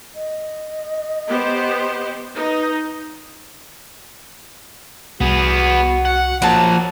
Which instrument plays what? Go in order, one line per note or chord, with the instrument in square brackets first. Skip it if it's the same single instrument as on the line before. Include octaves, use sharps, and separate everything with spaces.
[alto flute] D#5
[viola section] B3 G4 C5
[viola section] D#4 [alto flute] B4
[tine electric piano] C2 [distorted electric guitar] B3 G#4 [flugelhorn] F#4
[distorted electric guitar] F#5
[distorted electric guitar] F3 A#3 [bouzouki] F#3 A5